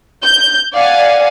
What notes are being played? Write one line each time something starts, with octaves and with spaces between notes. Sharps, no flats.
G6
D5 F5 F#5 G#5